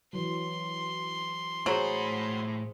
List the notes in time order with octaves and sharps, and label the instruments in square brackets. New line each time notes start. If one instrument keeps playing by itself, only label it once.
[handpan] E3 F#3 [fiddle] C6
[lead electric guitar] A2 B5 [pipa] F#3 [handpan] G#4 C5